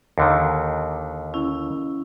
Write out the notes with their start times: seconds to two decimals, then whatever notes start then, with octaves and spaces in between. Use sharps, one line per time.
0.18 D#2 D3 D#3
1.34 C#4 E4